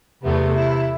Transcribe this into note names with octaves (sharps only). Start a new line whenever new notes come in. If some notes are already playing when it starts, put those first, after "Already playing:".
E2 C3 A3 B3
E4